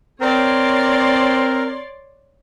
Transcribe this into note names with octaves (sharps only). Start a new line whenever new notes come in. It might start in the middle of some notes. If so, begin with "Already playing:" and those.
C4 A#4 C#5 D5 C6